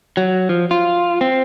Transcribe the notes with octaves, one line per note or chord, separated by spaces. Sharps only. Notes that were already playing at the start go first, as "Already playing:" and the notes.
F#3
F3
F4
C4